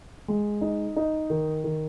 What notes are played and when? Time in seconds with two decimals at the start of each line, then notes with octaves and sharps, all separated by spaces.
0.28 G#3
0.61 D#4
0.96 D#4
1.30 D#3
1.64 D#3